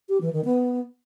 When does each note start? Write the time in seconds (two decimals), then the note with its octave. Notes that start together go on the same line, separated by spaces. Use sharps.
0.09 G4
0.21 E3
0.33 D#3
0.45 B3